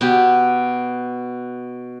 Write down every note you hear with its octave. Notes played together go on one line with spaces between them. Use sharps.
B2 B3 G4